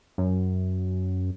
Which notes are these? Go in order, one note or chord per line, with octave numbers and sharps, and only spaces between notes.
F#2